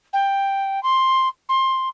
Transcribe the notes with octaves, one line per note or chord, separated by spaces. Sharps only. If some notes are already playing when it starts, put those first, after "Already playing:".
G5
C6
C6